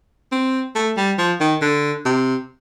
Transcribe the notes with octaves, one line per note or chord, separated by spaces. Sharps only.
C4
A3
G3
F3
D#3
D3
C3